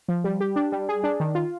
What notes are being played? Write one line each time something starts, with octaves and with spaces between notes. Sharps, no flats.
F3
G3
G4
D4
G3
G#4
D4
D#3
F4